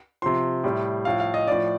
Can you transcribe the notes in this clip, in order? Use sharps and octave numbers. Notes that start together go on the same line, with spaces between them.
C3 F3 C6
A2 G3
A2 F3 F5
F5
D#5
A2 F3 D5